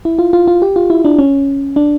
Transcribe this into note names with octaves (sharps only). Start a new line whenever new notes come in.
E4
F4
F4
F4
G4
F4
E4
D4
C#4
D4